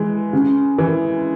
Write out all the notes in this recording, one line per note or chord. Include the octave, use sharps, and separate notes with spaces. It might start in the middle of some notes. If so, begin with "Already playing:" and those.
Already playing: E3 G#3
C#3
E3